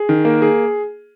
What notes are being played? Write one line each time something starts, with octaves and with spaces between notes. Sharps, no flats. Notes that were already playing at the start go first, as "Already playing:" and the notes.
Already playing: G#4
D#3
A#3
G#4